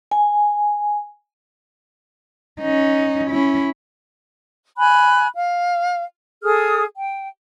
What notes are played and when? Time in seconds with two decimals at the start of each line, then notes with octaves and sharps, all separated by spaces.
0.11 G#5
2.61 C#4 D#4
3.30 C#4 E4
4.77 G#5 B5 F#6
5.35 F5
6.43 G#4 A4 D#6 F6
6.96 G5